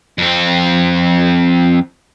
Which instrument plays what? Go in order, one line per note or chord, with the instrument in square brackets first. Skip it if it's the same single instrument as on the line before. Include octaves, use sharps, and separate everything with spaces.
[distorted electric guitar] F2 C4